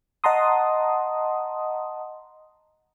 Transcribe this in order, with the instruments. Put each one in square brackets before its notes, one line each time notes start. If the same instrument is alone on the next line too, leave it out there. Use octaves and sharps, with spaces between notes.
[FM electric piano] D#5 F#5 A5 A#5 C6 D#6